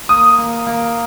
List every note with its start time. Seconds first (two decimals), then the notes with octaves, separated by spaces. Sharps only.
0.09 A#3 D#6
0.38 A#3
0.67 A#3